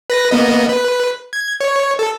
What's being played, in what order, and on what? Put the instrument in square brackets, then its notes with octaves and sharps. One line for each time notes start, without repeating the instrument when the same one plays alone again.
[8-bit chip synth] B4 A#6
A#3 B3 D#5
B4
G#6
C#5
A4